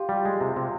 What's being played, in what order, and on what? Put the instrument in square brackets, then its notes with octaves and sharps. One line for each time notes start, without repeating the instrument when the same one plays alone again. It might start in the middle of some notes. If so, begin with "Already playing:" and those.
Already playing: [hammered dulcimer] F4 G4
[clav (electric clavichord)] G3
G#3
C3
C3